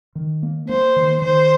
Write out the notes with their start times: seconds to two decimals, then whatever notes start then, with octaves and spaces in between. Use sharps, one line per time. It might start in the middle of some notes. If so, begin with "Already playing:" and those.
0.15 D#3
0.43 A#3
0.69 A#3 C5
0.96 D#3
1.22 D#3 C5